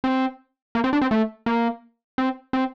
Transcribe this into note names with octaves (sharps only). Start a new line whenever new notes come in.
C4
A#3
C4
D4
C4
A3
A#3
C4
C4